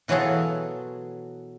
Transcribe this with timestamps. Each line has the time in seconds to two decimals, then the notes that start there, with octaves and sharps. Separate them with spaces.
0.08 B2 E3 F#3 F4 G#4 A4